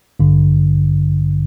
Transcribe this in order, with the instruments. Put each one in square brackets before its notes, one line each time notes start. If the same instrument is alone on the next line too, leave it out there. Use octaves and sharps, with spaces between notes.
[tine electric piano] A1 G2 D3